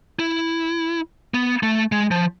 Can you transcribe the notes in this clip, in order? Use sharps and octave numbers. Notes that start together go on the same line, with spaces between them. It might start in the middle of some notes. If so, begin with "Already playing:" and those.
E4
B3
A3
G#3
F3